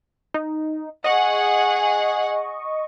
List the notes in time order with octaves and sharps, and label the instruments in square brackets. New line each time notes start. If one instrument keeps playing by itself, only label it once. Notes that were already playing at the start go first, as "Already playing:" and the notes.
[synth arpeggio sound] D#4
[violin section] G#4 F#5 [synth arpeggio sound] D#5 C#6